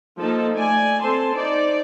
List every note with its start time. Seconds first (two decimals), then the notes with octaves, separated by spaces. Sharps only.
0.20 F3 A#3 D#4 A4 A5
0.54 A3 D5 G#5
1.02 C4 A4 C5 A5 C6
1.33 D#4 C5 D5